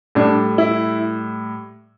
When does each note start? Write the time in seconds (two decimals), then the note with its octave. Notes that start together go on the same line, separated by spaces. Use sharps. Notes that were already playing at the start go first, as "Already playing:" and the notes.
0.15 A2 G3 D4
0.58 E4